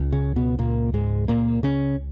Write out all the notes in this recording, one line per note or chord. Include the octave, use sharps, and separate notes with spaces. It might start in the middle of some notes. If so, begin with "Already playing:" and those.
Already playing: C#2
C#3 C#4
B2 B3
A#2 A#3
G#2 G#3
A#2 A#3
C#3 C#4